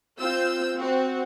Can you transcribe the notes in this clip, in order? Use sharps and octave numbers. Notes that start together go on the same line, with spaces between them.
C4 F4 E6 G6
C4 F#4